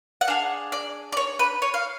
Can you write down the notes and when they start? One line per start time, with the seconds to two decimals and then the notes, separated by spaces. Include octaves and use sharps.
0.21 F#5
0.27 D4 G#4 F5
0.72 D5
1.12 D5
1.17 C#5
1.39 B4
1.62 C#5
1.74 F5